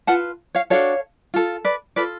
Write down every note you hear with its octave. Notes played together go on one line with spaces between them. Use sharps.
F4 B4 F#5 A5
C#5 F5
D4 F#4 A4 C#5 F5
F4 A4
B4 D5
F4 A4 B4 D5